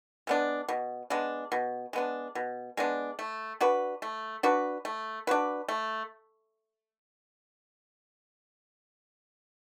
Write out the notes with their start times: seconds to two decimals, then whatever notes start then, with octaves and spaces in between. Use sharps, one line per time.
0.27 G#3 B3 D4
0.68 B2
1.10 G#3 B3 D4
1.52 B2
1.93 G#3 B3 D4
2.35 B2
2.77 G#3 B3 D4
3.19 A3
3.61 D4 F#4 B4
4.02 A3
4.43 D4 F#4 B4
4.85 A3
5.27 D4 F#4 B4
5.68 A3